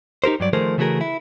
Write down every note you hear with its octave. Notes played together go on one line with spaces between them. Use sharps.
D#4 G4 A#4 C5
G2 F#3 D5
D#3 F3 A3 G#4 A#4 C5
C#3 E3 A3 F#4 G#4 A#4
E4